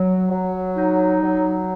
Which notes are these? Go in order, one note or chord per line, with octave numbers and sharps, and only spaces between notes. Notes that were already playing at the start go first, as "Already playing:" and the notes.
Already playing: F#3
F#3
D#4
F#3